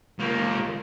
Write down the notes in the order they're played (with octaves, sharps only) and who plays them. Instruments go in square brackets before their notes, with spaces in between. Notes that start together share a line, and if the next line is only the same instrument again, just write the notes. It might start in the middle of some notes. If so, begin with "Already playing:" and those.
[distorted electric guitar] C#2 A#3